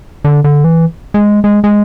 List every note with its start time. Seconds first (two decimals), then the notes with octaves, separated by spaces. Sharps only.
0.25 D3
0.44 D3
0.64 E3
1.14 G#3
1.44 G#3
1.64 G#3